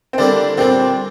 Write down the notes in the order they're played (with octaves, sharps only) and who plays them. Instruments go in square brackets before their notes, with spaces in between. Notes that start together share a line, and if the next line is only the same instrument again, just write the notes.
[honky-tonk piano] C4
[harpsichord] D3 G3 A#3 E4 [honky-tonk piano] D4
[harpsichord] A#2 G3 D4 [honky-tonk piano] C4